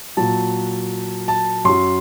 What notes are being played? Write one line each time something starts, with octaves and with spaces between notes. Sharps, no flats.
A#2 F#3 A5
A5
F#2 F#3 C6